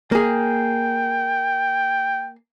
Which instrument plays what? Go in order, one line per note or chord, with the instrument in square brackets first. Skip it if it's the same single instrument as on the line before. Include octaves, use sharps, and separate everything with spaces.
[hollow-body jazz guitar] A#3 G#4 [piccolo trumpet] G5